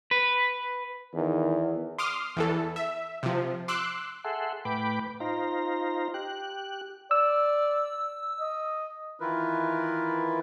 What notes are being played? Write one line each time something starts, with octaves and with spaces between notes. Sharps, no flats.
B4
E2 D#3
C6 D6 D#6 F6
E2 E3 A4
E5
C3 F3
C6 D6 E6 F#6
G#4 A4 E5 F#5 C6
A2 B4 G5 B5 D6
D#4 F4 C5 A#5
G4 F#6
D5 E6
D#5
D#3 E3 E4 F4 A#4 B4